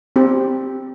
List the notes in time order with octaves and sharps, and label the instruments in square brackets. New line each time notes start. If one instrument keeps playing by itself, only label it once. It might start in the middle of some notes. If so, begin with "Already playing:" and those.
[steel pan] C4 G4